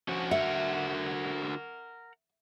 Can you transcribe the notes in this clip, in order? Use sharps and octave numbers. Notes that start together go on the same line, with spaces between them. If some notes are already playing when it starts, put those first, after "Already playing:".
D3 F3 C#4 F#4
A#4 E5 F#5